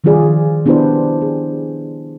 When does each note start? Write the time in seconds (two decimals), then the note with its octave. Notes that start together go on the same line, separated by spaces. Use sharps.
0.04 D#3 F3 G3 F4 G#4 D5
0.66 B3 D4 E4 G4 B4 C5
1.22 G#4